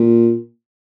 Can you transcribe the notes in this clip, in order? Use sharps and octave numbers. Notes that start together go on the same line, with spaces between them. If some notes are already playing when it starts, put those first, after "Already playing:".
Already playing: A#2